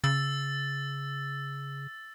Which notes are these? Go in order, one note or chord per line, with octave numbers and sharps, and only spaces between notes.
C#3 E6 A6